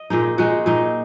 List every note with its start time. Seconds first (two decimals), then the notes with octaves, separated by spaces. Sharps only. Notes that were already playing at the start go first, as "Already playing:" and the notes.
Already playing: D#5
0.10 A#2 G#3 D#4
0.38 A#2 G#3 D#4 F#4
0.66 A#2 G#3 D#4